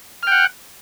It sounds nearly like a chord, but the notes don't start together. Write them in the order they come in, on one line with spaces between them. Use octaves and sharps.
F6 G5 F#5